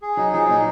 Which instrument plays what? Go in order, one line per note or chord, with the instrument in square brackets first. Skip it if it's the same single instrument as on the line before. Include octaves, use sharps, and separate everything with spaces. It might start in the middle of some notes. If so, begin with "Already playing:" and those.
[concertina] G#4
[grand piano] F#3 [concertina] D#4
[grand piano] F3 [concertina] G#4
[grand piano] A#2 [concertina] D#4